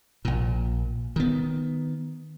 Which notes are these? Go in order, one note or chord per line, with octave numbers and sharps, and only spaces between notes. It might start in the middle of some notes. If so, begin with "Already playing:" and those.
A#1 A#2
D#3 B3